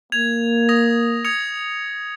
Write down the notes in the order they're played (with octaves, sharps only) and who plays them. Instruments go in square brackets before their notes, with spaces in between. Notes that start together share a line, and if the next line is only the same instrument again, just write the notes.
[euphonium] A#3 [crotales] G#6 F7
[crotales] D#6 A#6 F7
D#6 G#6 C#7 F7